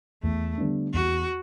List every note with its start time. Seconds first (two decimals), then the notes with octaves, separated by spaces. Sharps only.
0.23 E2 A3
0.58 D3 G3 B3 D4
0.93 E2 F#4